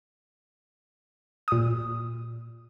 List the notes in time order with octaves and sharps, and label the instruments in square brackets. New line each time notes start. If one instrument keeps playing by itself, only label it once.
[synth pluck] A#2 D#6